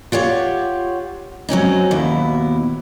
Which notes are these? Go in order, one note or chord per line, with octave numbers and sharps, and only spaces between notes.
F4 G4 C#5 F#5
F#3 C4 C#4 D#4
D#2 B2 E4